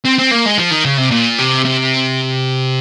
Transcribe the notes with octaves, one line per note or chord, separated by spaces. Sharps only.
C4
C4
A#3
G#3
F3
D#3
C#3
C3
A#2
C3
C3